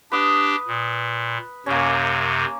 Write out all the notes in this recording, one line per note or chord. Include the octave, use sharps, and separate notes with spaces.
D4 G4 B4 D#6
A#2
F#2 C3 A#3 C#4